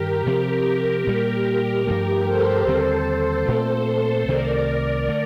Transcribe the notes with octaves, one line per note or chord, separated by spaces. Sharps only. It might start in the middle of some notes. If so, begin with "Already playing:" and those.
Already playing: G2 D#3 G3 G4 A#4
C3 F3 C4
A#2 G3 A#3
G2 F3 A3 G4 A#4
A4 C5
D#2 D3 G3 C4
A#2 A3 C4 A4 C5
C2 C3 D#3 A3 A#4 D5
D3 A3